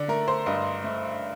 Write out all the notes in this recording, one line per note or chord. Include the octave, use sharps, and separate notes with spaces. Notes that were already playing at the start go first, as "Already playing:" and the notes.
Already playing: D3 D5
A3 A#4
C5
G2 D#5
A3